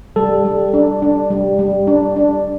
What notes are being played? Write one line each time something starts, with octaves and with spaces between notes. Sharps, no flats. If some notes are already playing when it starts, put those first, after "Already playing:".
G3 A4
G3
D4
D4
G3
G3
D4
D4